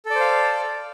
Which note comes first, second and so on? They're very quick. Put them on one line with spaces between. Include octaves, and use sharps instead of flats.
A4 D5 C5 F5